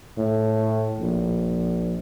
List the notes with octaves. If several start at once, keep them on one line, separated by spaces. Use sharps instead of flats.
A2
A#1